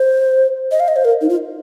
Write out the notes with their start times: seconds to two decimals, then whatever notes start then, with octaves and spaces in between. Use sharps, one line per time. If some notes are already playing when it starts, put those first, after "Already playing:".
Already playing: C5
0.71 D#5
0.80 F5
0.88 D#5
0.96 C5
1.05 A#4
1.21 D#4
1.29 F4